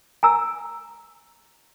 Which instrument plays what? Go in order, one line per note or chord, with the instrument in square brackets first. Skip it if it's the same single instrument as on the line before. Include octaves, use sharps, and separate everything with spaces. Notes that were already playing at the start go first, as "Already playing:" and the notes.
[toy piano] G#5 A#5 E6